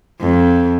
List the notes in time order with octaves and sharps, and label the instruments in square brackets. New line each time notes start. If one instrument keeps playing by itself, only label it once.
[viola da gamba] F2